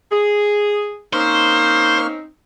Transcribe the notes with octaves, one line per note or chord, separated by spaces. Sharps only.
G#4
A#3 C4 C#4 D#4 C5 C#6 F6